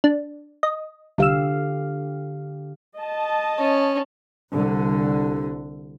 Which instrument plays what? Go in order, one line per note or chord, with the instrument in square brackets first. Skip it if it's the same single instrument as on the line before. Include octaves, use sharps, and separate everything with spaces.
[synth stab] D4
D#5
[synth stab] C2 E6 [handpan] D3 G4 F5
[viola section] D#5 A5
[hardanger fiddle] C#4
[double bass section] C2 D3